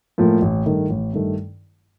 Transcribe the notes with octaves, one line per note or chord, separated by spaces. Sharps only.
A2 F3 A#3
A1
G2 D#3 A3
A1
G2 D#3 A3